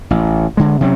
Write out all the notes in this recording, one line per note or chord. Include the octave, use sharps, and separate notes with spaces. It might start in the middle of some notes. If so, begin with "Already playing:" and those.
A1
D3 G#3
C3 F#3 C4 C#4